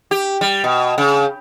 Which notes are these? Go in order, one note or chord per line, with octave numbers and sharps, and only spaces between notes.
G4
G3
B2
C#3